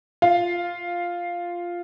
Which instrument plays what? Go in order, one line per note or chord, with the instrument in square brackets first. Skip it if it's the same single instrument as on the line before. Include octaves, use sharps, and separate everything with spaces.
[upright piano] F4 F5